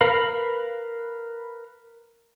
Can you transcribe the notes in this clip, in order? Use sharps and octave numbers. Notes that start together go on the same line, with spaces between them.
A#4 B4 F5 B5